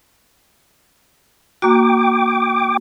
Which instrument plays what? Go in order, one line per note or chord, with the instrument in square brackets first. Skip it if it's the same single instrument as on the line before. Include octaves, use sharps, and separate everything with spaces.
[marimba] A#3 F#4 [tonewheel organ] G5 D6